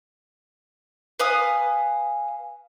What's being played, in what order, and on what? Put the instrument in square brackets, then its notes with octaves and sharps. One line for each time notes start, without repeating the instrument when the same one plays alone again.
[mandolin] B4 F5 G#5 D#6